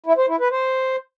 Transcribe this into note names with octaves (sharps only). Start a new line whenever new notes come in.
E4
C5
E4
B4
C5